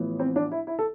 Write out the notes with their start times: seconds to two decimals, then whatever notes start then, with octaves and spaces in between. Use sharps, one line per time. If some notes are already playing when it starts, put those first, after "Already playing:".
Already playing: A1 A2 F3 B3
0.20 C4
0.36 D4
0.52 E4
0.67 E4
0.79 A4